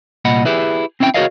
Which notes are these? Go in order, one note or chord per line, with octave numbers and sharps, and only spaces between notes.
C2 A#2 D#5 F#5 B5
E4 G4 G#4 B4 E5
C4 C#4 E4 F5 G5
F#4 G#4 A#4 C#5 D#5 F5